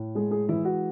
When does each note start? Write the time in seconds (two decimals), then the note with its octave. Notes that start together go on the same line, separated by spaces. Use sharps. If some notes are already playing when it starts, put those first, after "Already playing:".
Already playing: A2
0.15 G#3 G#4
0.31 G#4
0.49 E3 E4
0.65 F#4